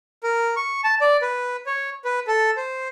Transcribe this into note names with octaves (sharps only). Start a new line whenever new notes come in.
A#4
C#6
A5
D5
B4
C#5
B4
A4
C5